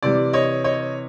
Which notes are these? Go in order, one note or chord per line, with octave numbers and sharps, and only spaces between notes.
C3 E3 G3 D5
C#5 D#5
C#5 D#5